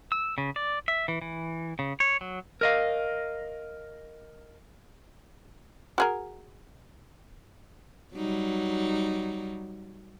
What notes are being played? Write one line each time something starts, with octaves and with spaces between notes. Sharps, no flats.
E6
C#3
D5
E5
E3
E3
C#3
C#5
F#3
A#4 D#5 F5
F#4 G#4 A#4
F#3 G3 D#4